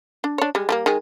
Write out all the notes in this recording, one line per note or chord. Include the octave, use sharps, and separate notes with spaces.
D4
D4 C#5
G3 G#3
G3 A3 A#3
D#3 G#3 G#4